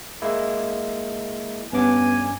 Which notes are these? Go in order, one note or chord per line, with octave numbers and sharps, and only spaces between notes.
G#3 A#3 E4
G2 B3 C#4 G#5 D6